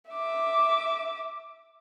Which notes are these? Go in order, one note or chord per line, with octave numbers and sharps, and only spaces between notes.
E5 D6